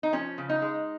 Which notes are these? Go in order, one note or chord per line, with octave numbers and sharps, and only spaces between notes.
D#4
F3 C#4
C#3
D#4
G#3